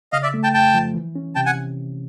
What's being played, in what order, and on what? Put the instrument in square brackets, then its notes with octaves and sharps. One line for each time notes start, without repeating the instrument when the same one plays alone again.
[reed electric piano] C#3 [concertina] D#5 F5
[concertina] D5 E5
[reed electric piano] A3
[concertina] G5 A5
[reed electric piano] F2 [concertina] G5 A5
[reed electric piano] F3
E3
C#4
[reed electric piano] C3 [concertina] G5 A5
[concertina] F#5 G#5